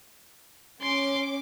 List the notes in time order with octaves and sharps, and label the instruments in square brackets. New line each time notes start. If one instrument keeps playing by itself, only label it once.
[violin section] C#4 D6 [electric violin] C6